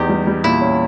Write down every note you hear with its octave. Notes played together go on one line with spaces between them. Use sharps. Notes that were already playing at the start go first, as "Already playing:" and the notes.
Already playing: E2 D#4 G4
G3
G3
A#2 E4
C#4